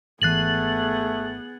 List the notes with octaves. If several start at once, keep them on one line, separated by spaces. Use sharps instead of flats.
G#1 E3 A3 B3 G#4 F#6 A6 F#7